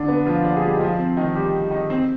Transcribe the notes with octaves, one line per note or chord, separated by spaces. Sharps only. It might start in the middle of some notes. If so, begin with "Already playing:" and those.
Already playing: D3 D4
B3
F3 F4
D3 D4
G#4
G3 G4
D#4
F3 F4
C4
D#3 D#4
G3 G4
D#3 D#4
C4